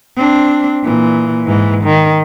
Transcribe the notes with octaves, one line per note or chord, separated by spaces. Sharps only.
C4 D4
A#2 E3
G#2 E3
D#3